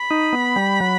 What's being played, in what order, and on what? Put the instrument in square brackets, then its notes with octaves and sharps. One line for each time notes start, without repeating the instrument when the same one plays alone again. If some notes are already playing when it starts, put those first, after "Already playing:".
Already playing: [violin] B5
[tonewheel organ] D#4
B3
G3
F#3